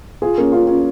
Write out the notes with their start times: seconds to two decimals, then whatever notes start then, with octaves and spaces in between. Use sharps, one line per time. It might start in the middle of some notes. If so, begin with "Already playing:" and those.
0.22 F4 G#4
0.38 A#3 C#4
0.52 C#4 F4
0.67 C#4 F4